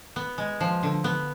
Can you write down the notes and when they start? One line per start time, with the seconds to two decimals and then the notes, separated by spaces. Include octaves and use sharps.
0.16 B3
0.38 G#3
0.60 F3
0.83 D3
1.04 B3